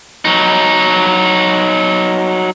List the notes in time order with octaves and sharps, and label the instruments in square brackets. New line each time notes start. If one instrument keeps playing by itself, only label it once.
[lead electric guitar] F#3 D#4